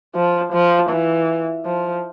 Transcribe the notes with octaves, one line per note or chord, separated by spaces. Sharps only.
F3
F3
E3
F3